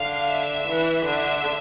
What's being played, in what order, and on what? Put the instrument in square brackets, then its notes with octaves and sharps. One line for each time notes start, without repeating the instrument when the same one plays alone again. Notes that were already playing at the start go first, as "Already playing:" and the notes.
Already playing: [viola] D3 [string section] F5
[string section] E5
[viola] E3
[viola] D3 [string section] E5